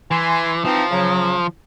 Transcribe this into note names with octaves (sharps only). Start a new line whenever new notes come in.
E3 G#5 C6
E3 F3 C4 D#4
C#3 F#3